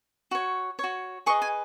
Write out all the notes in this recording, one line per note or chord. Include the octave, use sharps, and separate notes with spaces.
F#4 C#5
F#4 C#5
G#4 B4 D#5 C#6
G#5